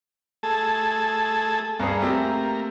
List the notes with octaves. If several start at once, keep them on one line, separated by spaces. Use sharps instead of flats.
A3 G#4 A4
G2 A#3 G#4
A3 C4 G4